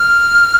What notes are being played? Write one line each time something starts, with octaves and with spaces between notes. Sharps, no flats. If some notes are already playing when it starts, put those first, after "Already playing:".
Already playing: F6